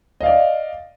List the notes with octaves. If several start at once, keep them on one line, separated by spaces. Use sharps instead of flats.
D5 D#5 F5